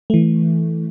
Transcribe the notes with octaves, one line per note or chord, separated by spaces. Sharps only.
E3 A3